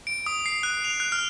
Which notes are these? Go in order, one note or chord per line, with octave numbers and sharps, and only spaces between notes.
D7
D#6
C7
F#6
F7
F#6
F6